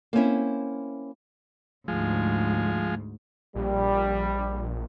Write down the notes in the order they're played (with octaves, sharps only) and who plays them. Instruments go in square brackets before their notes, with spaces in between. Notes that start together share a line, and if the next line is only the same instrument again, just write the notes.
[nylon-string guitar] A#3 C4 C#4 E4
[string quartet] D2 G#2 [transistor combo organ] F3 G#3
[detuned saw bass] A#1 [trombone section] G3